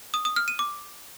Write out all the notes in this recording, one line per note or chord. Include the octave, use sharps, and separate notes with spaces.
D#6
D#6
F6
D#7
D6